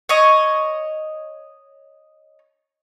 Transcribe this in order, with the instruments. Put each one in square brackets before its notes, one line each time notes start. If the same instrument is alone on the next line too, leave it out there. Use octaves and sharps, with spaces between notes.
[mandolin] C#5 D#5